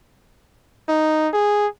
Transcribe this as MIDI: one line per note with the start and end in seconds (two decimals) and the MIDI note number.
0.89 1.28 63
1.34 1.67 68